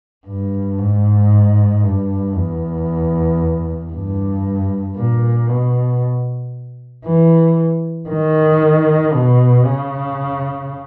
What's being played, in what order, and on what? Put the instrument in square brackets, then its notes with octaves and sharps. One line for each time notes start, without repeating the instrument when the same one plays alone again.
[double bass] G2
G#2
G2
E2
G2
A#2
B2
E3
D#3
B2
C#3